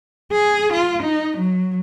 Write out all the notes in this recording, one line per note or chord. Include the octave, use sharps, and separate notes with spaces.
G#4
F4
D#4
F#3